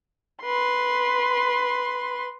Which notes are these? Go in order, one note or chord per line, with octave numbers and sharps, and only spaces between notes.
B4 C6